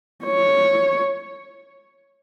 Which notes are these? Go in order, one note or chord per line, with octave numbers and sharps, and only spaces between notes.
C#5